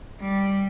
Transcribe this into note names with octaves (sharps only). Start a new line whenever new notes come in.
G3